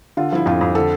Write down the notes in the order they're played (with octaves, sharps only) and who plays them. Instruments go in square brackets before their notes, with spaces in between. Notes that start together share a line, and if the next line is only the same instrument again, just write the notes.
[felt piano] D3 F4
F3 E4
F2 F4
F2
D3 A4